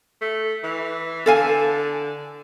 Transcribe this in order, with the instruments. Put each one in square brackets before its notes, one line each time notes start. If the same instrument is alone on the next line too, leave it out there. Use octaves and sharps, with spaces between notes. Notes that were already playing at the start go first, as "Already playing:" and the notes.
[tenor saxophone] A3
E3
[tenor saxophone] D3 [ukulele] A4 F5 G#5